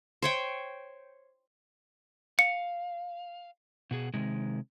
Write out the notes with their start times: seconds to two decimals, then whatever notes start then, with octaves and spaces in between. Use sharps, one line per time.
0.22 C5 C#5 G5
2.39 F5 C#7
3.91 B2 F#4 G#4
4.14 C3 D#3 G#3